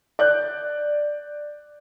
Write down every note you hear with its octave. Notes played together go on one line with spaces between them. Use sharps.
D5 F#6 G6